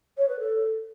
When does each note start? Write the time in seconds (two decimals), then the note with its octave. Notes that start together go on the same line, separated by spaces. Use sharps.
0.18 C#5
0.29 B4
0.39 A4